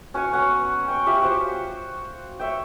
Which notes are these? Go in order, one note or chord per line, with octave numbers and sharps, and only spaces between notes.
C#4 F#4 C#5 G#5
B3 C#4 F#5 A#5
G5 C#6
F4 G4 E5
F#4 C5 F5
C#5 E5 G5